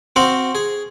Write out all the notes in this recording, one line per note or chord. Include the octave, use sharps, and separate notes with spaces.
C4 F#4 C5 F5 F#5
G#4